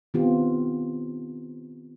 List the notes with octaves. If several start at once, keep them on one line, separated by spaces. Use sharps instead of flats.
D#3 B3 C4 F4 G4